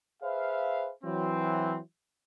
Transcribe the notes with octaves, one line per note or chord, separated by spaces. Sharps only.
G#4 B4 C5 E5 F5
E3 F#3 C4